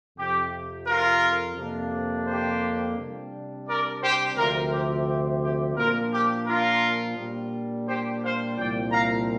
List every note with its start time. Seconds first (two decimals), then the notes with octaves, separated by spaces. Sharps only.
0.17 F2 C3 F3 G4
0.86 F4 A#4
1.57 F2 C3 A#3 D4
2.27 G4 C5
2.97 C3 G3 D4
3.67 A#4 D5
4.01 G4 C5
4.37 D2 C3 F3 C4 F4 A#4
4.71 G4
5.07 G4
5.42 G4
5.76 A#2 F3 A#3 D4 F4 A#4
6.12 G4
6.47 F4 A#4
7.16 A#2 G3 D4
7.86 G4 C5
8.21 C5 F5
8.56 C2 A#2 F3 C4 D5 G5
8.91 F5 A#5